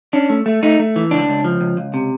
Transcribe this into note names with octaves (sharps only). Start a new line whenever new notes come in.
C#4 D4
A3
A3
A3 D#4
A3
E3
C#2 D4
C#2
F3
C#2
C#2
C3